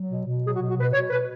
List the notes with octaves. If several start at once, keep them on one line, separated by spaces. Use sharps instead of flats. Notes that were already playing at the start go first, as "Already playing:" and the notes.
Already playing: F#3
B2
B2
F#3 G#4
F#4
B2
F#4
B2 B4
B2 C#5
B2 B4